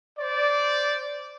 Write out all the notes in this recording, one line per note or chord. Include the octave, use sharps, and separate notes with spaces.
C5 D5